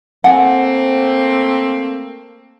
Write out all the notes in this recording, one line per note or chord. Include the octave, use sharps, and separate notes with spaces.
A3 A#3 C4 F#5 G#5